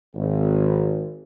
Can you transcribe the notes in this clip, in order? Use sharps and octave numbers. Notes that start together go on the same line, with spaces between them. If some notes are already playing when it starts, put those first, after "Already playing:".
G#1